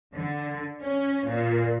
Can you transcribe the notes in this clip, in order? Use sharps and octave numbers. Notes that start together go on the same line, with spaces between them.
D3
C#4
A#2